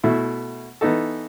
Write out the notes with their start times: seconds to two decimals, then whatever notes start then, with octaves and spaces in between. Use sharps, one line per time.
0.04 B2 A3 E4
0.81 E3 B3 D#4 A4